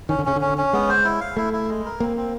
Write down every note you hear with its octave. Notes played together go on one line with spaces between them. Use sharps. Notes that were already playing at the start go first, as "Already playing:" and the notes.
D#3 C#4
D3
C#3 C#4
D3
C#4
C#4
G#3 B3
C5
E4
F5
A3 E4
E4
G#3
A#4
A#3 C4
C4